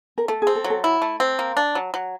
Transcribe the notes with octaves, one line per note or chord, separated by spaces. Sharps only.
A#4
A3 A4
G#4
C4
A4
F#3
A4
E4
A3
C4
A#3
D4
F#3
F#3